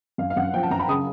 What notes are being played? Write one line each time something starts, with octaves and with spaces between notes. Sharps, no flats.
F#2 F5
F5
F#2 F#5
F3 G5
A5
F#2 A#5
B5
C#3 D#6